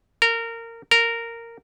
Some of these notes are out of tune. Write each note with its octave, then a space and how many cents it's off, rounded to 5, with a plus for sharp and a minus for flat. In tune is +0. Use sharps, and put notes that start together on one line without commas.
A#4 -20
A#4 -10